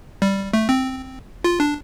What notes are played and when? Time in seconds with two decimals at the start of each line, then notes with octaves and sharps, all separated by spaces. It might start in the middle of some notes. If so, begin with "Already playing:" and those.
0.22 G3
0.53 A3
0.69 C4
1.44 F4
1.60 D4